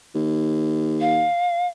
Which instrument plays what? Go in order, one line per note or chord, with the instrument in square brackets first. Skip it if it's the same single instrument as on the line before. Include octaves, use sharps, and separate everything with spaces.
[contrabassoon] D#2
[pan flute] F5